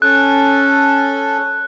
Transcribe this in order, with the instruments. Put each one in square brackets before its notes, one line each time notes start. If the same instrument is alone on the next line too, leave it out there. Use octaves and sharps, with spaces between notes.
[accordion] C#4 A4 [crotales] F#6